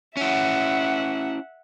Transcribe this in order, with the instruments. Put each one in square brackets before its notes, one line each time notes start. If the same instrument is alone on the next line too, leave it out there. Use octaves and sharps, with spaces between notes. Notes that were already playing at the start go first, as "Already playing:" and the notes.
[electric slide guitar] C#4 E4 [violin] E5 F#5